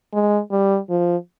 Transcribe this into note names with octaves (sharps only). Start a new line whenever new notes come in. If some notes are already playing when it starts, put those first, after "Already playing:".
G#3
G3
F3